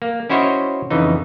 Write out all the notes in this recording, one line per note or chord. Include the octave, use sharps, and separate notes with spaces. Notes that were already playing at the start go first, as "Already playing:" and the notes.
A#3
C#4 E4 F#4 C5 C#5 D#5
F2 C#3 E3 D#4